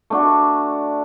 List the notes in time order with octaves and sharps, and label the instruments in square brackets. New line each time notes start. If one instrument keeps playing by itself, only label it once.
[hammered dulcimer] A3 D4 F#4